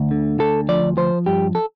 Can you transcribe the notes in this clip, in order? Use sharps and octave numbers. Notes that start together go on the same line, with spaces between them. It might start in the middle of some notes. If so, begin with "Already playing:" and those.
Already playing: D2
D3
D2 A4
F3 D5
F3 C5
G2 G4
A4